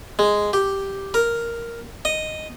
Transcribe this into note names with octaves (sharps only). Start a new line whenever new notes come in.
G#3
G4
A#4
D#5